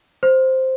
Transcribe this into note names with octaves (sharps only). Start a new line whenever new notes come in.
C5